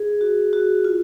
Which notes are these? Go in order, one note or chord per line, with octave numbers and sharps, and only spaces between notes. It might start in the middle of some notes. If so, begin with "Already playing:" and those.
Already playing: G#4
F#4
F#4
F4